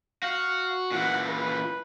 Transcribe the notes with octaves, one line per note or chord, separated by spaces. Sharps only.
F#4 F5
A#2 E3 F#5
B4